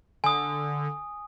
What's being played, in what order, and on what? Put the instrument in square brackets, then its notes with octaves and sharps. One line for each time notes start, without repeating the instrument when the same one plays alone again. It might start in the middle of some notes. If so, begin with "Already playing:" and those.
[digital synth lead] D3 [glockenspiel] G#5 D#6